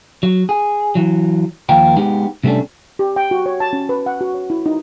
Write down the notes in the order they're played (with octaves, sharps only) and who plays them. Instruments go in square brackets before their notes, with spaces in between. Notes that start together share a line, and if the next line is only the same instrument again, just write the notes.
[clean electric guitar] F#3
G#4
E3 F#3
D#2 F3 A#3 A#4 G5
G#3 B3 D#4 G4
C3 G3 A3 C#4 D4
[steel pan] G4
G5
F#4
C#5
A5
C#4
B4
F#5
F#4
C#5
E4
D#4